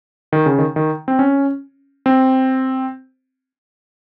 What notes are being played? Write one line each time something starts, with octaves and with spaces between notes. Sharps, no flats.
D#3
C#3
D#3
D#3
C4
C#4
C4